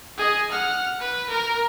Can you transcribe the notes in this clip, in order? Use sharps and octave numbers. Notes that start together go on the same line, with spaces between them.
G#4 D#5
F#5 F6
B4
A#4